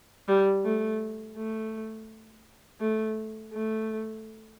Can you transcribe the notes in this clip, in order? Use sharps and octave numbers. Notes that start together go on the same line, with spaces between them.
G3
A3
A3
A3
A3